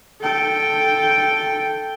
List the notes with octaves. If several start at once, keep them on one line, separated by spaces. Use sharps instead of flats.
A4 G5